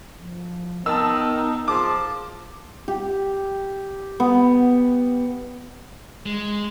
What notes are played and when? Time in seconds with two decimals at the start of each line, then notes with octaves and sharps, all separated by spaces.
0.22 F3
0.86 D#3 B3 D#4 A5 E6
1.68 F3 G#4 A5 D6
2.88 G4
4.20 B3
6.26 G#3